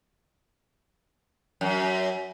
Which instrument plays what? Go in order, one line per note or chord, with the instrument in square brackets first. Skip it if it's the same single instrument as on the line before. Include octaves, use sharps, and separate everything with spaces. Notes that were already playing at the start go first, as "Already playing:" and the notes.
[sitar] F#2